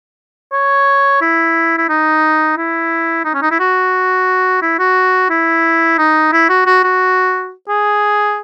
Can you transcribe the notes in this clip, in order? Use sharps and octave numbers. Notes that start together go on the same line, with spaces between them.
C#5
E4
E4
D#4
E4
D#4
C#4
D#4
E4
F#4
E4
F#4
E4
D#4
E4
F#4
F#4
F#4
G#4